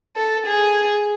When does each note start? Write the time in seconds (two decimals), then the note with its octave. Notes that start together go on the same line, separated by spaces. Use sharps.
0.16 A4
0.46 G#4